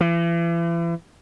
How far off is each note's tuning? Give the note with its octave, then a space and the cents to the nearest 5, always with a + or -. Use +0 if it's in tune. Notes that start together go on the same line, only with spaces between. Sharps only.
E3 +40